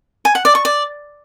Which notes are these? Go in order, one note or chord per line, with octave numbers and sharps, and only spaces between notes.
G#5
F#5
D5
C#6
D5